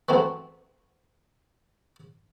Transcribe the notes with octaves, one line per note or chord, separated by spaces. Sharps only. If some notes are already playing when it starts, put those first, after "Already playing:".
E3 F#3 G#3 A3 C4